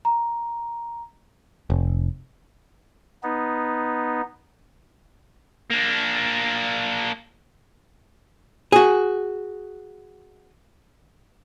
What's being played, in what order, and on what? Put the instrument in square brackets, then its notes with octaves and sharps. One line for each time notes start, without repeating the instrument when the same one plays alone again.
[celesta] A#5
[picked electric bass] F1
[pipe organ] B3 D#4
[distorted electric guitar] A#3 D4
[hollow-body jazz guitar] F#4 G#4